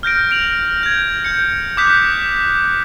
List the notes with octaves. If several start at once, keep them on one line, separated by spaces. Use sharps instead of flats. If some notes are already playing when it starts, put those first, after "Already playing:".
F6 G6 A#6 D7
D7 F7 F#7
G6 G#6
G6 C#7
D6 D#6 F#6 G6 B6